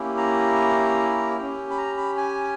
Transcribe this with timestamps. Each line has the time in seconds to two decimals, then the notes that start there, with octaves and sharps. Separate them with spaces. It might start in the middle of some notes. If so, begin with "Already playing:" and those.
Already playing: A#3 C#4 E4 G4
0.17 A#5
1.38 C#4 G4
1.70 B5
1.77 A#5
1.98 B5
2.17 G#5